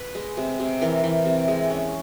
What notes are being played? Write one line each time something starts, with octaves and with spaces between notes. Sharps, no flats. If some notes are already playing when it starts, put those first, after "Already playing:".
Already playing: B4
G#3
C3
C3
E3 A#4
E3
C3
G#3
C#4